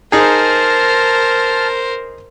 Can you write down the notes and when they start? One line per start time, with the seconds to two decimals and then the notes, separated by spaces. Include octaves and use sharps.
0.12 D#4 G#4 A#4 C5 A5 F6